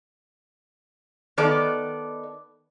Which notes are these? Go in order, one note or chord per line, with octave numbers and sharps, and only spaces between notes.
D#3 B3 A4 D5